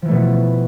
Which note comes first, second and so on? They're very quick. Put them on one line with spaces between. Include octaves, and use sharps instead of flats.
F3 E3 A3 B2 B3